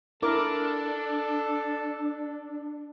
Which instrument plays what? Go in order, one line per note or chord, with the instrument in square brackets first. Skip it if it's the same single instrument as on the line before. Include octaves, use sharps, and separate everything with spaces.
[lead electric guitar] D4 [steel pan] E4 A#4 D6 [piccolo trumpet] A4